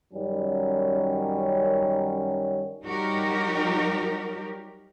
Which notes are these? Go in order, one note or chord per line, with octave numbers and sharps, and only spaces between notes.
F#2 D#3 F#3 G3 C#4
F#3 G3 D#4 F#4 G4 A#4